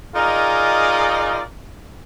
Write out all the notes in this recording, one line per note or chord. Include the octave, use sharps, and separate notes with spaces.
D#4 F4 G#4 A#4 D5 D#5